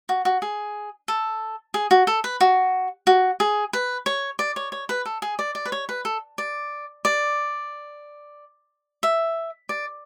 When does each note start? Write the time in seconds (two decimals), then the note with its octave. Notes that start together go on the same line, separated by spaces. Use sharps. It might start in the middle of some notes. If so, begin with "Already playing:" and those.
0.09 F#4
0.25 F#4
0.42 G#4
1.08 A4
1.74 G#4
1.91 F#4
2.07 A4
2.24 B4
2.41 F#4
3.07 F#4
3.40 G#4
3.73 B4
4.06 C#5
4.39 D5
4.56 C#5
4.72 C#5
4.89 B4
5.06 A4
5.22 G#4
5.39 D5
5.55 D5
5.66 B4
5.72 C#5
5.89 B4
6.05 A4
6.38 D5
7.05 D5
9.03 E5
9.69 D5